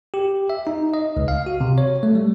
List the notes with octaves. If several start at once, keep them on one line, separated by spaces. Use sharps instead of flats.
G4
E5
D#4
D#5
C#2
F5
F#4
C3
C#5
A3
G3